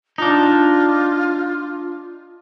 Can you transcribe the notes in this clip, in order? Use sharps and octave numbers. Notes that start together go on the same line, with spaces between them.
D4 D#4 F4